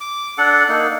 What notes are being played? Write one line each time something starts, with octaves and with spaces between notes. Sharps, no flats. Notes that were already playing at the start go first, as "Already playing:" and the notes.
D6
D4 A4 F#5
A#3 D#4